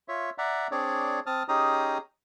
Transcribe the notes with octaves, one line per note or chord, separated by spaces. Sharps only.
F4 C#5 E5
D5 E5 F#5 A#5
C4 D4 G#4 C#5 D5
C4 A5 D#6 F6
C#4 D#4 G4 G#4 A#5 D#6